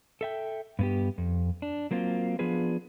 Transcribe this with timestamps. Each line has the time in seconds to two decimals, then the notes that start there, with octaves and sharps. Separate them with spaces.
0.21 A4 E5 G5
0.79 G2 B3 G4
1.18 F2
1.62 D4
1.91 F#3 A#3 C4 F4
2.39 F3 B3 D4 F4 G#4 B4